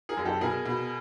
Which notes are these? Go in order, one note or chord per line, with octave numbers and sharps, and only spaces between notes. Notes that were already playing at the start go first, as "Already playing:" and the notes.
G#4 A#4
F#2
G4 A4
B2 G#4 A#4
B2